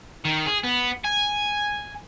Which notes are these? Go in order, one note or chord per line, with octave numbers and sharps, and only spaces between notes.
D#3
G#4
B3
G#5